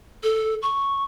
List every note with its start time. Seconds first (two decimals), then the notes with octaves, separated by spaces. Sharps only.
0.23 A4
0.62 C#6